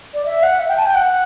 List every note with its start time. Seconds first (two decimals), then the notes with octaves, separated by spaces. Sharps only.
0.14 D5
0.26 E5
0.43 F#5
0.60 E5
0.69 G5
0.77 A5
0.86 G5
0.95 F#5